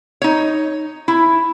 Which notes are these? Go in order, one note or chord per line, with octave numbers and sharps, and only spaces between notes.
D#4 C#5
E4